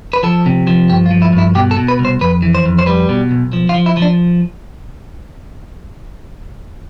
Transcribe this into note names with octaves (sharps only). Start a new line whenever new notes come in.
B4
F3 A4
C3
F3
G2 G4
F4
F3
E4
G2
E4
B2 G4
A4
B2
B4
C2
C5
F2 B4
E3
C5
F2
C5
G3 B4
B2
B1
F3
F4
F3
E4
F3
D4